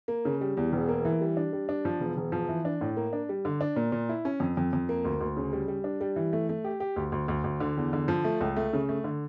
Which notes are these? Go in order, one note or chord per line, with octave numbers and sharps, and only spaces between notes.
A#3
C#3
G3
E2
E1
A#3
E3
G3
D4
G3
D4
F3
E1
E1
F3
E3
D4
A2
A#3
D4
G3
D3
D4
A#2
A#2
E4
C#4
F2
F2
F2
A#3
D2
D2
C#3
G3
G3
D4
G3
E3
A3
A3
G4
G4
D2
D2
D2
D2
D3
E2
D3
F3
A3
C#2
A3
C#3
A3
D3